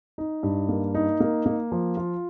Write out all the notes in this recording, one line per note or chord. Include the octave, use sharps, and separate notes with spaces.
D#4
G2
A#3
D#4
A#3
A#3
F3
F4